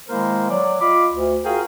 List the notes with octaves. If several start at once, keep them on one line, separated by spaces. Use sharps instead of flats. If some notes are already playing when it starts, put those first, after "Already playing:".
D#3 G#3 A#3 E4 A#4 C5
F#3 D5
F4 D#5 B5 D6
D2
F4 F#4 G#4 A#4 F5 G5